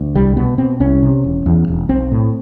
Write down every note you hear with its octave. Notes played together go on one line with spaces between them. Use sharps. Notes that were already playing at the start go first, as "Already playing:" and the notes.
Already playing: D2
C2 G3
B2 B3
B2 C4
C2 C#4
C3
E1
E2
E1
B1 C4
A2